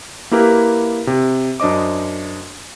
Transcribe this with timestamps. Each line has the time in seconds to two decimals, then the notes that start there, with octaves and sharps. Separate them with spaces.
0.32 A#3 E4 G4 A#4 B4
1.07 C3
1.60 F#2 D4 C5 D#5 D6